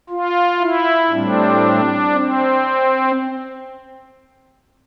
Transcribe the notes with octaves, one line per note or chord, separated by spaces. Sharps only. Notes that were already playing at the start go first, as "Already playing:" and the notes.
F4
E4
A2 G3 C4 D4
C4